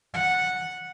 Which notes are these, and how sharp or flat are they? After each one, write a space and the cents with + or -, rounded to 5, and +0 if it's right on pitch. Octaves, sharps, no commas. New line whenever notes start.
F#5 -10